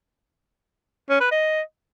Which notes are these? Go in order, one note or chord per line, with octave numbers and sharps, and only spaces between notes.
C#4
B4
D#5